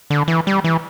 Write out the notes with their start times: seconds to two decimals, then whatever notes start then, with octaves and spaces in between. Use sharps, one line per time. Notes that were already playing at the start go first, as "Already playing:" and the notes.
0.10 D3
0.28 E3
0.47 G3
0.64 E3